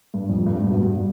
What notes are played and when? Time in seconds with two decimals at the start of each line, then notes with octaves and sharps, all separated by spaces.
0.14 G2
0.30 F2
0.46 G2
0.56 G#2
0.63 G2
0.70 B2
0.86 G2